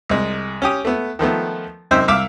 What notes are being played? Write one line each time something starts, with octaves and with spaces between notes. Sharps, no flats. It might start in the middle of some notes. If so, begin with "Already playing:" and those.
C2 G#3
C#4 G4 D#6
A3 B3
D#3 F3 A3 B3
F#2 C3 D#4 C5 E5 G5
C2 E5 F5 D6 E6